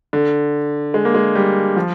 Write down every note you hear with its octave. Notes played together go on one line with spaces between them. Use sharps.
D3
G#3
A#3
G#3
G3
F3